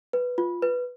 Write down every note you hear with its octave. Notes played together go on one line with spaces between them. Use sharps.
B4
F4
B4